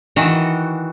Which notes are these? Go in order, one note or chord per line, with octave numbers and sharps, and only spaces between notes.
D#3 E3 F#4